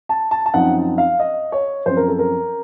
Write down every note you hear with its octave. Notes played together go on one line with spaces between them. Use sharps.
A5
A5
A5
F#2 F3 C4 D#4 F#5
F5
D#5
C#5
F#2 F3 C4 C5
A#4
A4
A#4